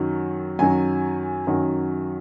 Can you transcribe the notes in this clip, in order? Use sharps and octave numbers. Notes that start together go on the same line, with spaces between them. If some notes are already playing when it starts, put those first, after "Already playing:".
Already playing: F#2 D#3 F#3
F#2 D#3 F#3 G#5
F#2 D#3 F#3